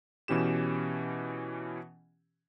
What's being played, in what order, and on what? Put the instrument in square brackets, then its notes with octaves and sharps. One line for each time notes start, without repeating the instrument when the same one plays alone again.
[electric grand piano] B2 E3 C#4 G4 E7